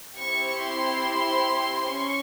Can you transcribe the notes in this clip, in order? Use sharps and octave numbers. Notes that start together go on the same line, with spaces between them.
C4 E4 G4 C#6
C6
C#4 C#6